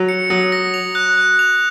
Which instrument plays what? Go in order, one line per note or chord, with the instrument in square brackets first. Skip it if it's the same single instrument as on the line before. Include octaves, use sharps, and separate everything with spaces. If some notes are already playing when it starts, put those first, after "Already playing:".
Already playing: [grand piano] F#3
[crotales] C#7
[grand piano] F#3 [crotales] D#6
[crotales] A#6
F7
F#6
F#6
F7